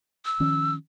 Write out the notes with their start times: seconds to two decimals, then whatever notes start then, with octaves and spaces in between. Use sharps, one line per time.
0.25 E6
0.40 D#3 F3 C#4